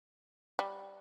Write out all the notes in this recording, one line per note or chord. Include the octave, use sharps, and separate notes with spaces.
G3